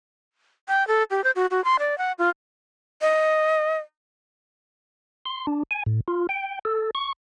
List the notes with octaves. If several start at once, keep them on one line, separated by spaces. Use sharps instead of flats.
G5
A4
G4
C5
F#4
F#4
C6
D5
F#5
F4
D#5
C6
D4
G#5
A2
F4
G5
A4
C#6